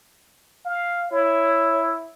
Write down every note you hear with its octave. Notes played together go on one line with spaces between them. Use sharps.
F5
E4 C#5